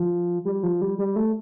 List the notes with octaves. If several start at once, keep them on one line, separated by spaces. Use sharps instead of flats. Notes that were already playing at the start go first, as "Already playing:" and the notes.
Already playing: F3
G3
F3
G3
G3
A3